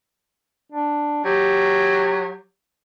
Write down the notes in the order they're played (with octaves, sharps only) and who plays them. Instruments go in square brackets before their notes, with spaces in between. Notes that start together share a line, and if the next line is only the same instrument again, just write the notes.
[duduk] D4
[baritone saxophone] F#3 [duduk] G4